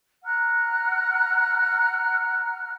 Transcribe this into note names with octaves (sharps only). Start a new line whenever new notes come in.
F#5 A#5 F6 F#6